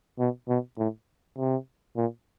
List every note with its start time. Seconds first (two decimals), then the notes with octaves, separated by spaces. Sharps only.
0.19 B2
0.49 B2
0.78 A2
1.38 C3
1.97 A#2